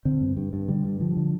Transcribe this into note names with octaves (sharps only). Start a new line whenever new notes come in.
D3 C4
G2
G2
G2
D3 G3
G2
D3 F3
D3